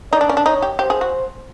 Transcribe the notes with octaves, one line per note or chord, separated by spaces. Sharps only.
D#4 D5
D4
C#4
D4
D#4 C#5
G4
G4 C5
G#4
F#4